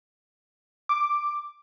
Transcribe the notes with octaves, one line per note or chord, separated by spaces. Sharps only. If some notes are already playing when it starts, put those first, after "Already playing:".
D6